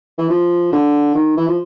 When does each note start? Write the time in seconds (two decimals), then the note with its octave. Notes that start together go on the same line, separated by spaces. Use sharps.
0.18 E3
0.30 F3
0.72 D3
1.15 D#3
1.37 E3
1.48 F3